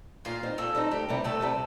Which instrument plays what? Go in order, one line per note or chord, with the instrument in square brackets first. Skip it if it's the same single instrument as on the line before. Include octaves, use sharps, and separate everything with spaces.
[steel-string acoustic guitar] A#2 [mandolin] F4 F5
[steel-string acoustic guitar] G3 C4 D#4
[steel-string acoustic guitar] A#2 [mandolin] A3 A4
[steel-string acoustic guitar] G3 C4 D#4
[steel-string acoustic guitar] D2 [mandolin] G4
[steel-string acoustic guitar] C3 G3 C4
[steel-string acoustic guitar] D2 [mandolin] A3 A4
[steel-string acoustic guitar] C3 G3 C4